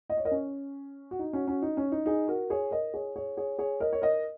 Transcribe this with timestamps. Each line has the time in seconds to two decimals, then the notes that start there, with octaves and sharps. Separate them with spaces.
0.10 D#5
0.17 C#5
0.25 A#4 D#5
0.31 C#4
1.11 F#4
1.19 D#4
1.33 C#4 F#4
1.47 C#4 F#4
1.62 D#4
1.77 C#4
1.92 D#4
2.06 D#4 G#4
2.28 F#4 A#4
2.50 G#4 C#5
2.71 A#4 D#5
2.94 G#4 C#5
3.16 G#4 C#5
3.37 G#4 C#5
3.59 G#4 C#5
3.80 A#4 D#5
3.93 C#5
4.02 A#4 D#5